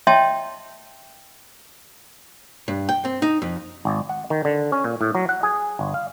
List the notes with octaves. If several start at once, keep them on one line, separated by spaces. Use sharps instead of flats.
C#5 D#5 E5 G5 A5 C6
G2
G5
C4
D#4
F2
G#1
F#5
D#3
D3
C#4
A#2
A2
F#3
F#5
G#4
G1
F5